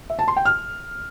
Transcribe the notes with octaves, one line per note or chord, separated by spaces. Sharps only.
E5
A5
C6
G5
F6